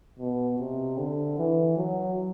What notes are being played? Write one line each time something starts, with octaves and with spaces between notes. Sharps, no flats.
B2
C3
D3
E3
F#3